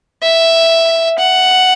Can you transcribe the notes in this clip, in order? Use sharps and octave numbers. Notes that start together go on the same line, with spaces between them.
E5
F#5